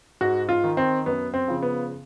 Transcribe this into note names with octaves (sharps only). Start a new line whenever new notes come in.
G#2 F#4
F4
D#3
C4
F#2 B3
C4
C#3 F3
B3